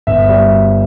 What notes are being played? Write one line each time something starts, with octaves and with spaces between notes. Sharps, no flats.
G1 E5
G3 E5